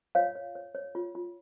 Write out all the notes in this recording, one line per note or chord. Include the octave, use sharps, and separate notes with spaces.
F4 C#5 F5
C#5
C#5
C#5
F4
F4